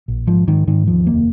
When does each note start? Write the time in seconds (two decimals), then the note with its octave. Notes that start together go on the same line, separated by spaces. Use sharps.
0.08 A#1
0.27 G#2 F3
0.48 G#2 D#3
0.67 G#2 D#3
0.87 D#2 F3
1.07 F1 A#3